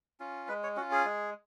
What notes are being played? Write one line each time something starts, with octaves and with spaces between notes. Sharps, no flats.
C#4 F4
G#3 B4
C#5
C#4 F4 F#4
G#4
G#3